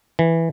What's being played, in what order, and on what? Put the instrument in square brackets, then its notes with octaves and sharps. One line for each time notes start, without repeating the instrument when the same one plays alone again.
[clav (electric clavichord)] E3